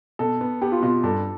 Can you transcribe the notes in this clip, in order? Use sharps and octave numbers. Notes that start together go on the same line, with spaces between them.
B2 A4
B3
B3 G4
F4
B2 F4
G2 A4